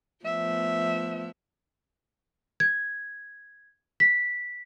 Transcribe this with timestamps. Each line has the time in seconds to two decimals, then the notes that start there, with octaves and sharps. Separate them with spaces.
0.25 F3 A3 B3 E5
2.60 G#6
4.00 B6